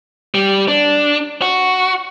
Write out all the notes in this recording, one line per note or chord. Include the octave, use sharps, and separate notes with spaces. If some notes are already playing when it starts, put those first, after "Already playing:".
G3
D4
F#4